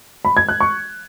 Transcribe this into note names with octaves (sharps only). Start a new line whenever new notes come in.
B5
G#6
F#6
C#6